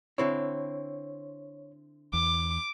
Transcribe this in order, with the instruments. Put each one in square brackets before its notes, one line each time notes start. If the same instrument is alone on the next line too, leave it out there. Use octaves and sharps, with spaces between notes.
[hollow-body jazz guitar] D3 C4 E4 [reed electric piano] C#5
[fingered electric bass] E2 [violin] D6